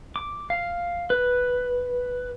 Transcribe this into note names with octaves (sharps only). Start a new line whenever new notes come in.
D6
F5
B4